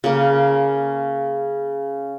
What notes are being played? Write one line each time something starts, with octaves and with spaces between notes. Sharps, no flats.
C#3 A#3